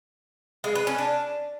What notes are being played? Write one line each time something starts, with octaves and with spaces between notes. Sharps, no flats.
G#3
B4
C#4
D4